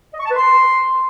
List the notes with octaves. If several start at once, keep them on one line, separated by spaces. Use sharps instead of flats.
D#5
C#6
A5
B4
C6